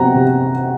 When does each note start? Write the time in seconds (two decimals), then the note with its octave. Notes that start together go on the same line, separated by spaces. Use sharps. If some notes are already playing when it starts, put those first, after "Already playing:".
Already playing: C3 F#3 C4 F#5 A#5
0.15 C3